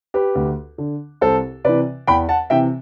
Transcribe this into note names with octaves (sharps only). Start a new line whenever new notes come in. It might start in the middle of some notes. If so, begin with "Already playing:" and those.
G4 B4
D2
D3
C2 A4 C5
C3 E3 B4 D5
E2 G5 B5
F#5 A5
C3 E3 E5 G5